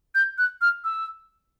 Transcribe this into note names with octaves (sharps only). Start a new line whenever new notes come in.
G6
F#6
F6
E6